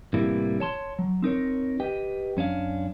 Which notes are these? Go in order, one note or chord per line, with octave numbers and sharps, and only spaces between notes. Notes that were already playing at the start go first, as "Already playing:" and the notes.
A2 C3 E3 G3 A#3 E4
C#5 A5 C6
F#3
C4 D#4 A#4 C#5
G4 B4 D#5 G5
F#2 C#4 D4 F5